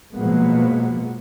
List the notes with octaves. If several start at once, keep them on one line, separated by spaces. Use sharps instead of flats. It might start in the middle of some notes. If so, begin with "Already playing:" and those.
B2 F3 F#3 G#3 A#3 B3